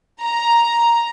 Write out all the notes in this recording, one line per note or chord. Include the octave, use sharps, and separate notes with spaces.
A#5